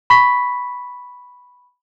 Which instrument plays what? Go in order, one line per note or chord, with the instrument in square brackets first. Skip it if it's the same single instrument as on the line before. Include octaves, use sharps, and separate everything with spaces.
[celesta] B5 C#6 B6